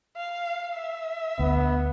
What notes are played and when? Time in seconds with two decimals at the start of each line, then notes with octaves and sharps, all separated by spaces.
0.17 F5
0.74 E5
1.39 D2 B3